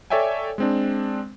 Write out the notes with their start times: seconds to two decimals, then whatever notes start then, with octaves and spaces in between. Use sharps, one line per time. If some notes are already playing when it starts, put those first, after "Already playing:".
0.10 A4 C#5 D5 E5 G5 G#5
0.58 G#3 C4 D4